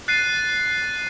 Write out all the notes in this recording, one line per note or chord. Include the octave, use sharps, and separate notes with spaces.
F#6 A6 C7 D#7